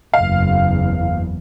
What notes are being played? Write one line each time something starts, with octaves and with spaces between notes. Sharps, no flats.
F#1 E2 F5